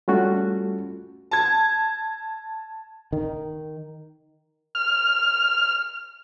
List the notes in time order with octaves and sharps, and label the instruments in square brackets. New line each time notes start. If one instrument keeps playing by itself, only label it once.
[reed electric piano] G3 A3 C#4 F4 F#4 A4
[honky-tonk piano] A5 G#6
[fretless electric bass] D#3
[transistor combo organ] F6